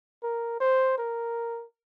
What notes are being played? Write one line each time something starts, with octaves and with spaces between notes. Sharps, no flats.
A#4
C5
A#4